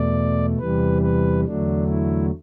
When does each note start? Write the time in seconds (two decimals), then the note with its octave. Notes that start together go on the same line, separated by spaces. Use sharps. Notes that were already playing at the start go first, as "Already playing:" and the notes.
Already playing: E2 B2 A3 D5
0.59 E2 C3 E3 G3 B4
1.02 B4
1.45 E2 D3 F#3 A3 D4
1.88 E4